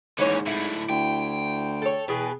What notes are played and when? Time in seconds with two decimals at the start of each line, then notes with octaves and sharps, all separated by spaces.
0.19 D#2 G#2 D3 E3 C#4 C#5
0.47 A2 D3 E4
0.89 D2 G5
1.82 A4 C#5
2.08 E2 B2 B3 G#4